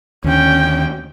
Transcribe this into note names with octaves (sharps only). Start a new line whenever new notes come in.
D#2 D3 C#4 G5